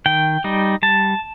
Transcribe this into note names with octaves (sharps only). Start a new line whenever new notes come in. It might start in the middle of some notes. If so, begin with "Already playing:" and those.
D#3 G5
G3 D#4
G3 A5